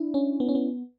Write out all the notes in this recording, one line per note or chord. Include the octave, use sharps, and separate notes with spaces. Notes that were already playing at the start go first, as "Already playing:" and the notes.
Already playing: D4 E4
C#4
B3
C#4
B3